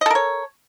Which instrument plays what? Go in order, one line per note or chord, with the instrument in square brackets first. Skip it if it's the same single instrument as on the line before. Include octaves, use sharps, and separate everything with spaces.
[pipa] D#5
A4
A#4
C#5